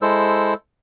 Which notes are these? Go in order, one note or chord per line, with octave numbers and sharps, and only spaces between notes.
G#3 E4 A4 C5 E6